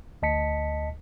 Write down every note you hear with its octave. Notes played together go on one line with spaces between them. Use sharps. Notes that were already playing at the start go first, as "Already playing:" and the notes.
D2 D#5 A5 B6 C#7